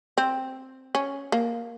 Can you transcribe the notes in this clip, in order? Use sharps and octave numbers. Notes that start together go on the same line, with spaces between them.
C4
C#4
A#3